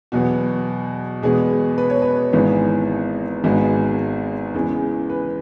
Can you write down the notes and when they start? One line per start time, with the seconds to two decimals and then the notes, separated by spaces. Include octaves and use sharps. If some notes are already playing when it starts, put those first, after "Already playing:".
0.12 E2 B2 F#3 B3 F#4
1.22 E2 B2 G#3 B3 G#4
1.78 B4
1.90 C#5
2.02 B4
2.33 G#1 G#2 E3 G#3 B3
3.44 G#1 G#2 G#3 B3 F#4
4.54 E2 C#3 E3 G#3
5.09 B4